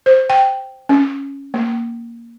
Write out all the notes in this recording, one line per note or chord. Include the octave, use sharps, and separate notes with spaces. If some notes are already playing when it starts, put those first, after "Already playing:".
C5
G5
C#4
A#3